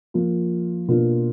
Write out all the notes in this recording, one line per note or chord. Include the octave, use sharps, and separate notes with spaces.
F3 A#3 F4
B2 A#3 D4 F4